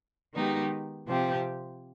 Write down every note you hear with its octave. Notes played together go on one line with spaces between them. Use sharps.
D#3 G#3 B3 D#4 G4
C3 F3 C4 G4